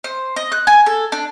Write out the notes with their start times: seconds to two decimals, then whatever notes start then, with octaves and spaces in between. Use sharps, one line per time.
0.04 C5
0.36 D#5
0.52 F#6
0.67 G#5
0.86 A4
1.12 D4